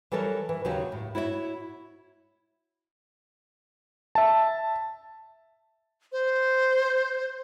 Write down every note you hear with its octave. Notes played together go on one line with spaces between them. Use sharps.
E3 F#3 G3 A4 A#4 C#5
E3
D#2 C#3 F#3 F#4 G4 C#5
A2
E4 F#4 C#5 D5 E5
E5 A5
C5